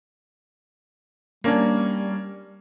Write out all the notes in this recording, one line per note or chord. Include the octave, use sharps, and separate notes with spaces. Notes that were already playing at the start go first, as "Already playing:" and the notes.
G3 A#3 C#4 D4